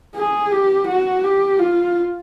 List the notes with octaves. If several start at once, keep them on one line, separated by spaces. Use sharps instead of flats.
G#4
G4
F#4
G4
F4